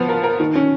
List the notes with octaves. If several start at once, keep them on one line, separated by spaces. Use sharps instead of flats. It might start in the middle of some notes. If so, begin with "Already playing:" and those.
Already playing: F3 B3 F4
A#4
A#4
D#3
C#4